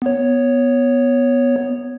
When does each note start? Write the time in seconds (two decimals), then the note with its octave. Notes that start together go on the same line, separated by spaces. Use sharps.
0.02 B3 C#5